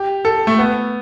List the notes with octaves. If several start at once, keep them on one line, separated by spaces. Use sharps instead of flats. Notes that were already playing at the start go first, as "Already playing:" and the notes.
Already playing: G4
A4
A3
B3